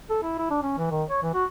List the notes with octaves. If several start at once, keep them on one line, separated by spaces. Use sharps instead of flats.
A4
E4
E4
D4
C#4
E3
D#3
C#5
E3
F#4